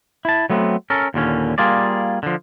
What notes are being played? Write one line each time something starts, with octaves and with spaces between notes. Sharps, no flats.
E4 A5
F#3 A3 B3 C4
C#4 A4 A#4
D#2 A#2 D3 C#4
G3 A#3 F4 G#4 D5
D3 F3